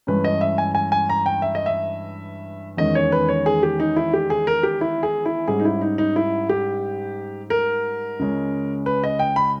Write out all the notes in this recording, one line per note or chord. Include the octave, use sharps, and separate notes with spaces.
G2 E3 G#3 C#4 B4
D#5
E5
G#5
G#5
G#5
A#5
G5
E5
D#5
E5
E2 D#3 G#3 C#4 D#5
C#5
B4
C#5
G#4
G4
D#4
E4
G4
G#4
A#4
G4
E4
G#4
E4
G#2 G3 C#4 G#4
D#4
E4
D#4
D#4
E4
G4
A#4
C#2 C#3 G#3 C#4
B4
D#5
G5
B5